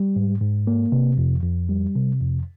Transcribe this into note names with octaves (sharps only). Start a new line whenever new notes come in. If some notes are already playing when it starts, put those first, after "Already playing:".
Already playing: G3
G#2
G#2
A#3
C3
F2
F2
G3
C3
F2